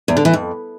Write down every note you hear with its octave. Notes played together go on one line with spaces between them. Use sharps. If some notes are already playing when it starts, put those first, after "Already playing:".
E2
D3
E3
F2